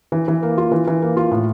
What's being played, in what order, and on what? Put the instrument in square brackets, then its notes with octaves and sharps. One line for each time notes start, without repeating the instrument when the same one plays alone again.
[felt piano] E3
E3
A#3
F4
E3
E3
A#3
F4
A2